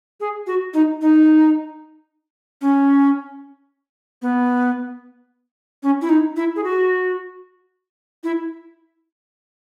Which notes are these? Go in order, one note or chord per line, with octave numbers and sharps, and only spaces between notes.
G#4
F#4
D#4
D#4
C#4
B3
C#4
E4
D#4
E4
G#4
F#4
E4